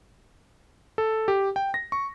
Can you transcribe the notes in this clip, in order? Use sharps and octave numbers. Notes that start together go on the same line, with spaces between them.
A4
G4
G5
A#6
C#6